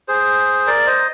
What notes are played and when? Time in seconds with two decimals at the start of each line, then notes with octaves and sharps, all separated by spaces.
0.08 G#4 C5
0.67 A#4 D5
0.87 C5 D#5